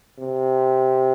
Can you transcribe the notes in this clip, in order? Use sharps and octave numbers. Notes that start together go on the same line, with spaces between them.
C3